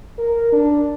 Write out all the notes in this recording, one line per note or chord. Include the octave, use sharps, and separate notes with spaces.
A#4
D4